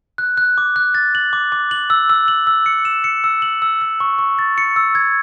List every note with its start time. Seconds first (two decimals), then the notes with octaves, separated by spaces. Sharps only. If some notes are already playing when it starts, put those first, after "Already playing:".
0.18 F#6
0.37 F#6
0.58 D6
0.76 F#6
0.95 A6
1.15 F#7
1.33 D6
1.52 D6
1.71 F#7
1.90 E6
2.10 E6
2.28 F#7
2.47 E6
2.66 C#7
2.85 E7
3.04 C#7
3.24 E6
3.42 F#7
3.62 E6
3.81 E6
4.00 C#6
4.19 C#6
4.39 A6
4.58 C#7
4.76 E6
4.95 G#6